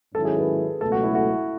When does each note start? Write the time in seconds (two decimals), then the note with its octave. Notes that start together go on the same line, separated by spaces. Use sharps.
0.14 G#2 D#3 F#3 C#4 E4 A4
0.25 G#4
0.37 B4
0.81 C#2 B2 F#3 A3 A4
0.92 F#4
1.04 E4
1.15 F#4